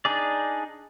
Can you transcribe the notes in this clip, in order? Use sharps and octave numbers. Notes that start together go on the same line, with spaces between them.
D4 D#4 G#4 D5